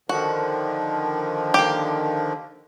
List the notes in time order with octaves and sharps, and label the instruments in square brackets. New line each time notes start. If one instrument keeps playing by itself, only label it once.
[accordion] D3 D#3 F3 [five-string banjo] F#4
[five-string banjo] A#3 G4